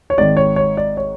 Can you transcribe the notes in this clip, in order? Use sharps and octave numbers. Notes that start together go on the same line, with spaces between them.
C#5
G#1 G#2 D#3 D5
C#5
C#5
D5
C#5